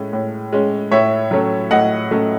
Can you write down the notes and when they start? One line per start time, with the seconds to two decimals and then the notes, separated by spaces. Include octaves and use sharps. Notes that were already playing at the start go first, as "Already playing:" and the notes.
Already playing: A2 G#3 C#4
0.13 A2
0.53 G#3 C#4
0.91 A2 C#5 E5
1.31 F#3 A3 C#4
1.71 A2 D#5 F#5
2.11 F#3 A3 C#4